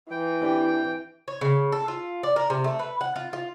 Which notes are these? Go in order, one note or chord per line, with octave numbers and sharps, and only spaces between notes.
E3 G5
C4 D4 E4 G4
C#5
C#3
A4
F4
D5
A#4
C3
A3
B4
F#5
F4
F4